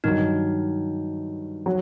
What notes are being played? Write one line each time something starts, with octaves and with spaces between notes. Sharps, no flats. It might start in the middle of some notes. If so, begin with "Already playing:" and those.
G2 D#3 F#3 D#4
F#3